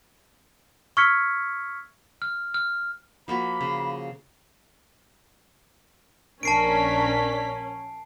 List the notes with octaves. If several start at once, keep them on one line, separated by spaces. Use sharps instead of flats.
C#6 E6 F6 G#6 B6 C#7
F6
F6
F3 A#3 F#4 B5
C#3
A#1 C#4 D4 A#4 A5 B6 C7 D7